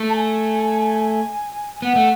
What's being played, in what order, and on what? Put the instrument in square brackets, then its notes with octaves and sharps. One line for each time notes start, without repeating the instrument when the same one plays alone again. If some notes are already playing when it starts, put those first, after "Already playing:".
Already playing: [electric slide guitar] A3
[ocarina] A5
G#5
[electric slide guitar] B3 [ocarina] F#5
[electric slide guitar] A3